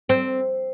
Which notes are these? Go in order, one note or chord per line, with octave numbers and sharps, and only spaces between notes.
C4